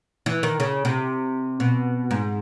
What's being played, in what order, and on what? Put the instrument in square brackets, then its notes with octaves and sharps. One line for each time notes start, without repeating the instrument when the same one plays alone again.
[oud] E3
D#3
C#3
C3
B2
G#2